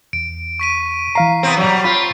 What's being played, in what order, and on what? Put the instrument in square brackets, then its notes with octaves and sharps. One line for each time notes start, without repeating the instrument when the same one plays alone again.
[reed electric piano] E2 [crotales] D7
[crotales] C#6 B6 D#7
[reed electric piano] E3 F5 A#5 [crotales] B6 C7 D#7
[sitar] C3 B3 C4
F#3 G3
[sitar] C4 F4 [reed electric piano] B5